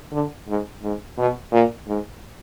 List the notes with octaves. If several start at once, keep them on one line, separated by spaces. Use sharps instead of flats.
D3
G#2
G#2
B2
A#2
G#2